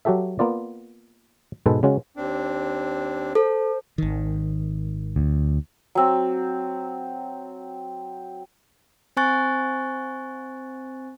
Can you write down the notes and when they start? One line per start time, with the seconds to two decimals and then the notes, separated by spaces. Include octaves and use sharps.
0.05 F#3 F#4 G4 A4 E5
0.39 A#3 B3 F4 D5
1.66 G#2 B2 G#3 A4 B4
1.83 C#3 G#3 C#4 F#4
2.17 D#2 C4 D4
3.35 A4 C5
3.98 G#1 D#3
5.16 D2
5.95 F#3 C4
9.17 C4 C5 G#5 C#6 F#6 A6